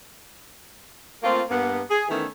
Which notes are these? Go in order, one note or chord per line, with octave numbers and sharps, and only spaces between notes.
A3 A#3 C4 F4
G2 A#3 B3
G#4
D#3 E3 A3 B3 C#4